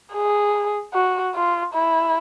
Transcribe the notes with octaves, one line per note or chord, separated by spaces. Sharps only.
G#4
F#4
F4
E4